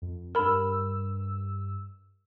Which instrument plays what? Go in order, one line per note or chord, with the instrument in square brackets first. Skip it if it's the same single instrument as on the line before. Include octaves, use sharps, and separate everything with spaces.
[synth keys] F2
[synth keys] G2 E6 [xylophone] A#4 B5